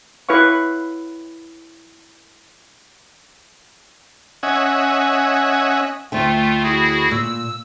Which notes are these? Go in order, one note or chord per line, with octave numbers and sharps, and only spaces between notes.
E4 B4 C#5 F5 C#6
C#4 D#5 E5 F#5 G#5
D2 A3 F4 G5
E4 F#4 G#4
A#2 E6